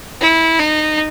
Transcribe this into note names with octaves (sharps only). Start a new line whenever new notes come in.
E4
D#4